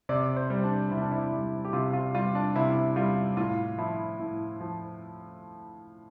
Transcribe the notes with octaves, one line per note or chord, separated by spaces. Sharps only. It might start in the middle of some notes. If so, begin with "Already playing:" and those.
C3 D5
C5
G3
D4
C3 E4
D4
E4
G3
G4
C3 F4
F4
G3 F4
D4
C3 E4
G3 F4
A2 F4
F3 E4
A2
F3